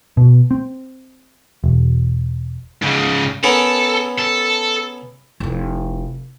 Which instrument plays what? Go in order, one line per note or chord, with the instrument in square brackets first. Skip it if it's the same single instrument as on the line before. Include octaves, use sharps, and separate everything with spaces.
[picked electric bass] B2
C4
E1
[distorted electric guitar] G#2 C#3
[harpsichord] B3 C#4 A#4 [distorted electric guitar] A4
[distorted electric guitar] A4
[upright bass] F1 E4